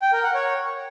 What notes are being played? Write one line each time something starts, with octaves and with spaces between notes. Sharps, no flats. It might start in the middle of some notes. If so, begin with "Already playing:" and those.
G5
A#4
F#5
C#5